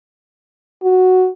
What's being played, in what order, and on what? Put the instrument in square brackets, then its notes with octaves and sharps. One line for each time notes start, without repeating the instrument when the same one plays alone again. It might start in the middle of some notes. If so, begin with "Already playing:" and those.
[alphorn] F#4